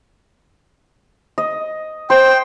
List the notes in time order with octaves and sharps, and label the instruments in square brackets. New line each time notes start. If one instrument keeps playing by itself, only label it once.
[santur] D#5
[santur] C5 [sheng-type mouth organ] G5